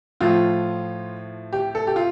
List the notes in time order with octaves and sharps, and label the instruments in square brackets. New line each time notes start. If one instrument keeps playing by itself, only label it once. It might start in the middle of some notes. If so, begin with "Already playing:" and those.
[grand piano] A2 F3 F4
G4
A4
G4
F4